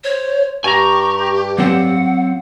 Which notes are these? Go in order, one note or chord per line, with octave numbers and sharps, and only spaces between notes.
C5 C#5
G2 G4 G#5 A#5 C#6
F#3 C4 F#5